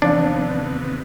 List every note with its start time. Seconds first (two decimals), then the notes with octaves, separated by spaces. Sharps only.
0.02 D#2 C3 E3 F3 B3 D4 F5